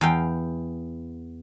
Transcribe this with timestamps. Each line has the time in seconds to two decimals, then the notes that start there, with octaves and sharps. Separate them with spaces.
0.01 E2 F5 G5